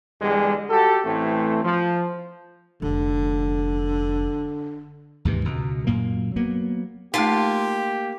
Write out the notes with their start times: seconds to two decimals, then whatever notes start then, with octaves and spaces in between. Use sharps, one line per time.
0.21 E2 D3 G3 G#3
0.70 F#4 G4 A4
1.05 A1 A2 E3 A3 C4
1.64 F3
2.82 F1 D3
5.25 D#2 G#2 C3 E3
5.44 C#2 B2
5.87 F#2 A#2 A#3
6.36 F#3 A#3 B3
7.14 A3 A#3 D#4 F4 G4 A5 C6